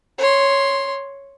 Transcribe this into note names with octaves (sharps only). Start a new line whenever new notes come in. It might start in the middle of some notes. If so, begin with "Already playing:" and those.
C#5 C6